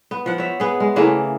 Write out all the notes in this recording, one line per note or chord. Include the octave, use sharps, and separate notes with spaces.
B3
F3 F#5
C#5 E5
B3 G#4
G#3
C#3 E3 A3 A#3